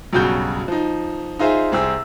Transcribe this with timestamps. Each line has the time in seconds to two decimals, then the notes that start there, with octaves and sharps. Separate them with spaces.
0.13 B1 G2 C#3 F#4 G6
0.68 F3 D#4
1.39 D#4 F4 G#4 C5 E5
1.72 C2 C4 G#4 E6